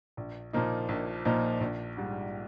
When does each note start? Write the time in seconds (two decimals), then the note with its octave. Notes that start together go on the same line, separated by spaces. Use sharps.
0.17 A#1
0.53 A#2 F3 A#3 D#4
0.89 A#1
1.25 A#2 F3 A#3 D#4
1.61 A#1
1.97 G#2 G3